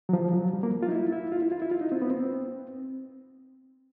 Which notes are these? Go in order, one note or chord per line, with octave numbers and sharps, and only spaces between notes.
F#3
F3
F#3
G3
A#3
F4
D#4
E4
E4
F4
E4
F4
E4
F4
D#4
C4
B3
C4